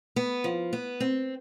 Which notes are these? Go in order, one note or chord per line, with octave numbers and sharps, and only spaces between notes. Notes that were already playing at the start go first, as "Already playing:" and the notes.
B3
F3
B3
C4